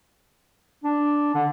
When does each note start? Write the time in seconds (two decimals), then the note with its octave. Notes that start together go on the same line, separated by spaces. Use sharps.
0.84 D4
1.34 D3